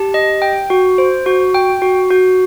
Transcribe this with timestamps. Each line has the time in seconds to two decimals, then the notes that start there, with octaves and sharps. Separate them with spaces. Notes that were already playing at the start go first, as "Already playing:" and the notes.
Already playing: G4 A5
0.14 D#5
0.42 G5
0.70 F#4
0.98 C5
1.26 F#4
1.54 G5
1.82 F#4
2.10 F#4